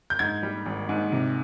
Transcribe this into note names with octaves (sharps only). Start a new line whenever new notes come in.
G6
G#2 G#6
G3
G#1
G#2
C3